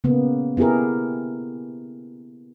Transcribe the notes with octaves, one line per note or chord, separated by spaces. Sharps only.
C#3 A#3 B3
B3 E4 G4 G#4 A#4